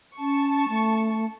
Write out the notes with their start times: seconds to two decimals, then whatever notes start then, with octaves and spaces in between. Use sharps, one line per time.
0.19 C#4 A5 C#6
0.69 A3